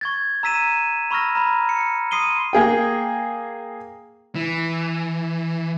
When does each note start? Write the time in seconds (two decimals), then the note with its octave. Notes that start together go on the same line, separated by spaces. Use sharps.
0.01 C#6 G#6 A6
0.43 A#5 E6 B6 D#7 E7
1.11 B5 C#6 E6 F6 A#6
1.35 A#5 B5
1.69 C#7
2.11 C6 D#6 C7 D#7 G7
2.53 A#3 G#4 G5
4.35 E3